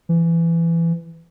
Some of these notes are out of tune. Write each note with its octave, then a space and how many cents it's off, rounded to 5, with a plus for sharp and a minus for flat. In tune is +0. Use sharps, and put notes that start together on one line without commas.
E3 +20